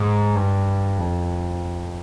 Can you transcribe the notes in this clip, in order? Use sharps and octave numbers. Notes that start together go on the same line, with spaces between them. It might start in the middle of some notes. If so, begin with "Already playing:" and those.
Already playing: G#2
G2
F2